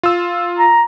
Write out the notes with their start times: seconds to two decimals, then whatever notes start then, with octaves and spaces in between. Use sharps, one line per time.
0.03 F4 E6
0.59 A#5